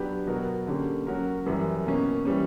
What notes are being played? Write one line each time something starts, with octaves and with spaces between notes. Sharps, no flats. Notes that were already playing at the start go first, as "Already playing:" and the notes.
Already playing: F#3 B3 D4 G4 B4
B2 F#3 B3 F#4 A#4
D3 A#3 C#4 G4
F#3 C#4 F#4 A#4
F#2 E3 G3
B2 A#3 C#4
E3 G3 C#4